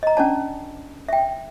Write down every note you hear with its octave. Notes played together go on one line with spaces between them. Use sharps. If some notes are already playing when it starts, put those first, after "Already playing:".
D#5 A#5
C#4 D4 D5 A5
E5 G5